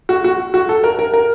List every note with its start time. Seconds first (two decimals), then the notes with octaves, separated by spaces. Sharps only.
0.09 F#4
0.24 F#4
0.54 F#4
0.69 A4
0.84 A#4
0.99 A#4
1.14 A#4